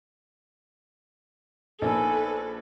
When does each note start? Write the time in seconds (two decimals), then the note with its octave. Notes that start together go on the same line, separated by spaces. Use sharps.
1.82 A#1 A#3 B3 D#4 A4 B4 G#5